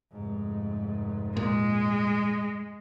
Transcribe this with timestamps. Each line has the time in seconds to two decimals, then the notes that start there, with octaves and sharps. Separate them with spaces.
0.12 F1 G#2
1.37 A#2 G#3